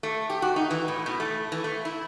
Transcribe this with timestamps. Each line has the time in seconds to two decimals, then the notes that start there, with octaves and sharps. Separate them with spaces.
0.03 A3
0.30 G4
0.42 F#4
0.56 D#4
0.71 E3
0.88 A2
1.06 B2
1.20 A3
1.52 E3
1.64 A3
1.85 E4